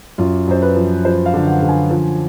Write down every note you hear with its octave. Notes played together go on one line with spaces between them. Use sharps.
F#2 F4
F#2 C5
B4
F3
F3 C5
F5
D3
F#5
D3
G#5
F3